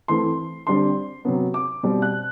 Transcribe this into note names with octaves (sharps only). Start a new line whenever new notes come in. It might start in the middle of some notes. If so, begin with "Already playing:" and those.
E3 A3 C4 C6
D3 G3 C4 C6
C3 F#3 B3
D6
B2 G3 C4
F#6